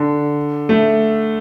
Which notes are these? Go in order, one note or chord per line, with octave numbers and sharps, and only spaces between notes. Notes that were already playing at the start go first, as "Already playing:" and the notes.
Already playing: D3
A3